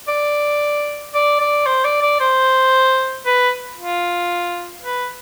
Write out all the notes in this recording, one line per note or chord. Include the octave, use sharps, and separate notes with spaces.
D5
D5
D5
C5
D5
D5
C5
B4
F4
B4